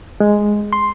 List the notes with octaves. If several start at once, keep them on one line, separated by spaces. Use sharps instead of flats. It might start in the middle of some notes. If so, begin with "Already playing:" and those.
G#3
C6